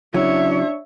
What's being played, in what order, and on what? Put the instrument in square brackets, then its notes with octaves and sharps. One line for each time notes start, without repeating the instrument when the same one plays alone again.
[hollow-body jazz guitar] C#3 F#3 E4 [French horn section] D4 [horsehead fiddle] C#5 E5